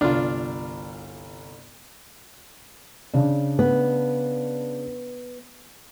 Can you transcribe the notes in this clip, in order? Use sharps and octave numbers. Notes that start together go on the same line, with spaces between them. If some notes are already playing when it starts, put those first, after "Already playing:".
G1 C2 D4 F4 F6
C#3 D4
B3